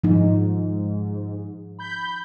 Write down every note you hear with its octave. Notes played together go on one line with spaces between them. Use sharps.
G#2 F3 D#4
B5 G6